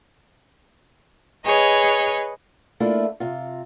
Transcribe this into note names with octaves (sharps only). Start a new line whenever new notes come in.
G#4 B4 C#5 D#5
A3 A#3 D4 E4 F4
C3 F4